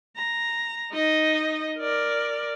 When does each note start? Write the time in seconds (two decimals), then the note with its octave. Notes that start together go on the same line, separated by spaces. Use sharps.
0.17 A#5
0.92 D#4 D#5
1.79 A#4 D5